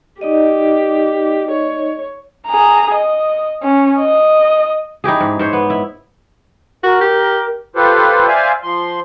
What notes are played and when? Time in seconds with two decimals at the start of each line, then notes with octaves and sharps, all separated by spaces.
0.21 D#4 G4 D5 D#5
1.51 C#5
2.47 G#4 A#5
2.94 D#5
3.63 C#4
3.98 D#5
5.04 D#4 E4 G4 G#4
5.20 G#2
5.39 G#2 C5 C#5
5.53 B3
5.70 E4
6.83 F#4 A#4
7.01 G4
7.76 F4 G4 A4 B4 C5
8.28 C5 D5 E5 F5 G#5
8.63 F3 C6